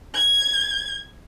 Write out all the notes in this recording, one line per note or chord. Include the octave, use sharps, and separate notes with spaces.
G#6